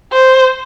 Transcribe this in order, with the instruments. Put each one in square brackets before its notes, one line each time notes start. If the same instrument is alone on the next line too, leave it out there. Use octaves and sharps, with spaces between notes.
[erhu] C5